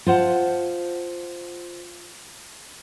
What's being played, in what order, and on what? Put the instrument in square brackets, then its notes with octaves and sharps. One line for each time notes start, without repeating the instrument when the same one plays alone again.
[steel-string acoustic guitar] F4 C5 F#5 A5